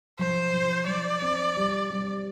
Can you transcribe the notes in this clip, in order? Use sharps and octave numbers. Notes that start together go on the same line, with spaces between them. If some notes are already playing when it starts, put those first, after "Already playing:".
F3 C5
F3
F3 D5
C4
G3
G3